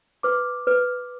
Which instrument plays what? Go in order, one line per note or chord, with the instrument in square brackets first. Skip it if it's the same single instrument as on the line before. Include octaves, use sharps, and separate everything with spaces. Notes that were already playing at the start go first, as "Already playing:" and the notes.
[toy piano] B4 [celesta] D6
[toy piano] B4